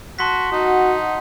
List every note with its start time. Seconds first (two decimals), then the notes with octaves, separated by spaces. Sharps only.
0.19 F#4 A5 C6 B6
0.52 D#4 F#4 F#5